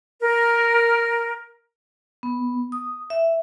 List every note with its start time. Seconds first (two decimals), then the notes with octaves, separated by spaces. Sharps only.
0.22 A#4
2.23 B3
2.72 D#6
3.10 E5